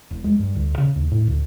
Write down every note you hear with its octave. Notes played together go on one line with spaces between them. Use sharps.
E1
G#3
G2
D2
C#3
D#2
A2
D2